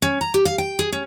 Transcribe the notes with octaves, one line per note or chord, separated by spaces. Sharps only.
C#4
A#5
G4
F5
G5
G#4
C#4